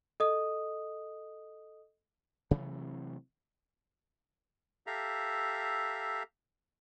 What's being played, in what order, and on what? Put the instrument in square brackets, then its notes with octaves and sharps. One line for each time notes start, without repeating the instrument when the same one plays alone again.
[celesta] A4 D#5 D#6
[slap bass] C3 E3 F#3 A3
[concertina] G4 A4 E5 F5 A#5